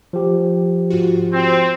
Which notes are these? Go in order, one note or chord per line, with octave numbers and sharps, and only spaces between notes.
F3 G4
G#2 F4 F#4
C4